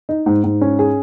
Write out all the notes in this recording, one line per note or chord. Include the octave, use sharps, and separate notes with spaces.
D#4
G#2
G#2
C#4
G#4